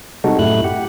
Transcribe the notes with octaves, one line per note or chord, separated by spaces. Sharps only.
C3 G3 G#3 D#4 F#4 A4
F#2 A2 A3 E4 F#6
G4 F#5